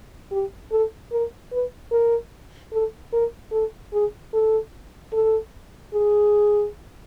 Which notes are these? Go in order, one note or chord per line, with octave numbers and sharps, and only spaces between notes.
G4
A4
A#4
B4
A#4
A4
A#4
A4
G#4
A4
A4
G#4